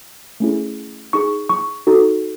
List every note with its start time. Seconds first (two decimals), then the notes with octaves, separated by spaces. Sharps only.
0.40 A3 C#4 E4 G#4
1.13 D#4 G#4 C#6
1.49 C#6
1.87 D#4 F#4 A4